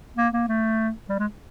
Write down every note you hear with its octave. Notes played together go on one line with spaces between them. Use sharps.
A#3
A#3
A3
G3
G#3